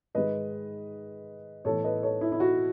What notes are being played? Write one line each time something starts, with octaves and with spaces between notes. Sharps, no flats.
G#2 D#3 G#3 B4 D#5
A2 E3 B3 A4 C#5
B4 D#5
A4 C#5
E4
E4
F#4